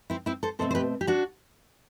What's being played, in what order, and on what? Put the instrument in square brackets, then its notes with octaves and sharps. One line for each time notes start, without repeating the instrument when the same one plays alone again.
[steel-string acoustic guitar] C4 E4
C4 E4
A4 C5
B2 A3 C4 A4 C5
C5
G4 B4
G4
D4 F#4